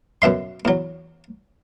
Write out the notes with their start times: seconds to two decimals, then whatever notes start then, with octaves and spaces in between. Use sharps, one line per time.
0.22 F#2 B2 E5 C6
0.65 E2 F#3